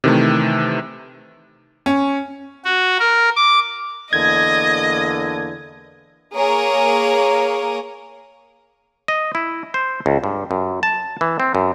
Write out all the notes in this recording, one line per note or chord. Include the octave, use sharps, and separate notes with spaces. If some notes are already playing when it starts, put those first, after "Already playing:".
C3 D#3 E3 A3
C#4
F#4
A#4
D6
E2 D3 A#3 D#5 G#6
A#3 G#4 A#4 C#5
D#5
E4
C5
C#2
G2
F#2
A5
E3
C4
F#2